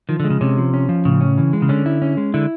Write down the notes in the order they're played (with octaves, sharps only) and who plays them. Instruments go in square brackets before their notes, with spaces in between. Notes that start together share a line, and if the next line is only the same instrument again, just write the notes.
[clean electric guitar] D#3 [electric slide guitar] F3
[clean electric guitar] D3
[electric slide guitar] G#3
[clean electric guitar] C#3
[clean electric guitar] C3 [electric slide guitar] C#4
[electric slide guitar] F3
C#4
F3
[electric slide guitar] A2 [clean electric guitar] C#3
[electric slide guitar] C#4
E3
G#3
[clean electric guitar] C#3
[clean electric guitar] D3 [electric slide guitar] C#4
[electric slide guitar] E4
C#4
G#3
[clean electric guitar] D3 [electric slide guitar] E4